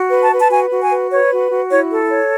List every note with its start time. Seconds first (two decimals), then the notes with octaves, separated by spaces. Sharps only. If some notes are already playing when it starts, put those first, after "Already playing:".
Already playing: F#4
0.10 B4
0.21 A5
0.31 B4
0.39 A5
0.50 F#4 G#5
0.71 F#4
0.81 G#5
0.91 B4
1.11 B4 C#5
1.31 F#4
1.51 F#4
1.70 E4 C#5
1.90 A4
2.10 C#5